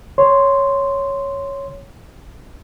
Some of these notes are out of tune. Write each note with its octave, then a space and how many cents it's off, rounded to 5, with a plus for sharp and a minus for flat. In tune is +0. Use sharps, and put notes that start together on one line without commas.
C#5 +0 C6 -5